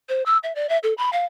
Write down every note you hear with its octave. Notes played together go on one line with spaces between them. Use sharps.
C5
E6
E5
D5
E5
A4
B5
F5